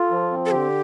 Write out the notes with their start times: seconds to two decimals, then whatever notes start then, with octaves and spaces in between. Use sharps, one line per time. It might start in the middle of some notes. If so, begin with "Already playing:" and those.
Already playing: F4 A4
0.11 F3
0.31 C4
0.46 A4
0.51 D3 G4